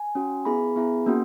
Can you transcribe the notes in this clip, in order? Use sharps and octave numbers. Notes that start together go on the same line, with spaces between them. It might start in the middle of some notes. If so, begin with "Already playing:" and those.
Already playing: G#5
C#4 F#4
B3 E4 G#4 B5
B3 E4 G#4
A#3 C#4 F#4